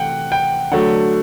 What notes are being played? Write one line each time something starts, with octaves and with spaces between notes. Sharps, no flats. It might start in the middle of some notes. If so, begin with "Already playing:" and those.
Already playing: C3 E3 A3 F#5 G5
G5
D3 F#3 A3 F#5